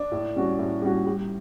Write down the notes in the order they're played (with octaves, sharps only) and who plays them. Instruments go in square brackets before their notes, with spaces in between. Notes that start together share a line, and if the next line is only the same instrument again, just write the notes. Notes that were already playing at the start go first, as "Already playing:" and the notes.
Already playing: [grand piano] D4
[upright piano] A2
G3 C#4 F#4
A2
G3 C#4 F#4
G3